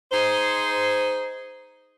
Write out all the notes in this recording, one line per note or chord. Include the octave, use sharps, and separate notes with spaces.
D#4 G#4 C5